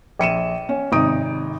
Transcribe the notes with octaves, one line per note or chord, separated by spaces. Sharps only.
A#1 C#7 D#7 E7
C#4
G#1 C3 D#4 D#6 D7